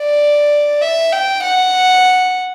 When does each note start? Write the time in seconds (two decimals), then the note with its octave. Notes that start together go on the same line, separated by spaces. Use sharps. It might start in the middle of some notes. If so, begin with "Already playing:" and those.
Already playing: D5
0.81 E5
1.12 G5
1.43 F#5